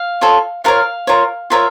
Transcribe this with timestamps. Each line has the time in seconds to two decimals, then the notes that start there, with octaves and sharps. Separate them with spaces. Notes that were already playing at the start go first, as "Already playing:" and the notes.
Already playing: F5
0.21 F4 A4 C#5
0.64 F4 A#4 C#5 F5
1.07 F4 A#4 C#5
1.50 F4 A#4 C#5 E5